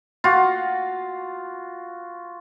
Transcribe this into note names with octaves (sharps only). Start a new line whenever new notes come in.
F4 F#4